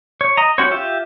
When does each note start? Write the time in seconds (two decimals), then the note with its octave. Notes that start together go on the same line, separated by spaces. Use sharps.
0.21 C#5
0.37 D#5 A#5
0.58 C#4 F#4 G4 C5 C#5
0.71 F4 G4 E5